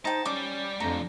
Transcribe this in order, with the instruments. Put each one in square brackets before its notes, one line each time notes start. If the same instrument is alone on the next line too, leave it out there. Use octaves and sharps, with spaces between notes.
[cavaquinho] D#4 G5 [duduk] C5 [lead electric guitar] A5
[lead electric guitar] G3 D5 [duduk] C#4 [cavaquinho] D6
[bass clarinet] F2 [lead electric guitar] F3 A3 [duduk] D4 [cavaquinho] A#5